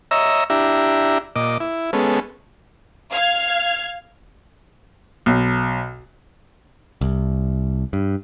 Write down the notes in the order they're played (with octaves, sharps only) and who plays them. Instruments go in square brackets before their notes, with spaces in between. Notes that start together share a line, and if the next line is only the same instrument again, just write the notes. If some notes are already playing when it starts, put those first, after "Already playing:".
[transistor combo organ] C#5 D#5 E5 A#5 E6
D4 E4 G4 E5 A#5
A#2 D#5 D6
E4
G#3 B3 C#4 A4
[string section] F5 F6 G#6
[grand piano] B1
[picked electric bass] C2
G2